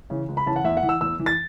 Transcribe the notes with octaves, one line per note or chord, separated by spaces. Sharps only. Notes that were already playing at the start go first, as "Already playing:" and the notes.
C#3 E3
C#2
B5
C#3 E3 A5
F#5
E2 E5
F#5
E3
E6
E2 E6
E3
A6